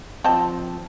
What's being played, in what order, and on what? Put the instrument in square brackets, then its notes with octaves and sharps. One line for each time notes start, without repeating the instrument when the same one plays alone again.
[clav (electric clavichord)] F3 C4 [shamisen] G4 D#5 A5